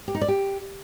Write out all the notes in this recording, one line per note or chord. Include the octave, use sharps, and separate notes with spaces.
G4
D#4
D5
G4